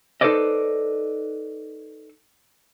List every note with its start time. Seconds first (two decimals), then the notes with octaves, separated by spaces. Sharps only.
0.21 D#4 A4 B4 C5 D5 D#5